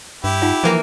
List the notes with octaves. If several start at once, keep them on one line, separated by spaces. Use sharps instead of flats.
G2 E4 G4
D#4 F4 F#5
E3 F3 A#3 A#5